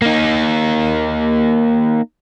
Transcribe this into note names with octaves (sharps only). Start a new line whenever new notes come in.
A#3 D#4